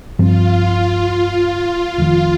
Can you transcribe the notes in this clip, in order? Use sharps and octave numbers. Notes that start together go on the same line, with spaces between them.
G2 F3 C4 F4
F4
F1 F2 D#3 F4